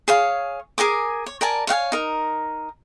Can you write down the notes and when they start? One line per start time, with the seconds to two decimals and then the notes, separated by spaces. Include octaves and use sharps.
0.08 G#4 C#5 F5
0.78 G#4 A#4 G#5 D6
1.26 C#5
1.41 A#4 D5 G#5 A5
1.67 C#5 F5 F#5 G#5
1.92 D#4 A#4